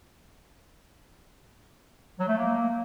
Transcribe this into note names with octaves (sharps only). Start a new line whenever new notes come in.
F#3
A3
A#3